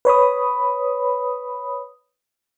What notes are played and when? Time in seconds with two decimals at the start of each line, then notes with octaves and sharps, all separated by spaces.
0.05 B4 C#5 B5 D#6